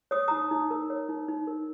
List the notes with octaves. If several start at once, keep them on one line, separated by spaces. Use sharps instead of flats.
C#5 D#6
D#4 A#5 D#6
D#4
A#4
C#5
D#4
D#4
A#4